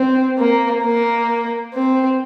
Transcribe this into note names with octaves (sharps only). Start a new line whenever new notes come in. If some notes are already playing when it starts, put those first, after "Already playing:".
Already playing: C4
A#3
A#3
C4